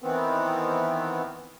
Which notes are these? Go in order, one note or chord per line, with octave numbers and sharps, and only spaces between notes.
D#3 E3 B3 C4